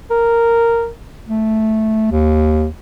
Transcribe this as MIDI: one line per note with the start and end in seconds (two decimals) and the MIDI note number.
0.11 0.89 70
1.28 2.09 57
2.11 2.68 39